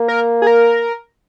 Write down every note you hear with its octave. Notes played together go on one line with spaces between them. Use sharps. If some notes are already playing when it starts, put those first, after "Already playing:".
Already playing: A#3
A#4
G#4
A#4